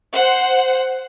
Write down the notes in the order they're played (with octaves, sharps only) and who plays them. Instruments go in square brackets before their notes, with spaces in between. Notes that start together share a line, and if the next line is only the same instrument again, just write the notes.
[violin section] C5 F#5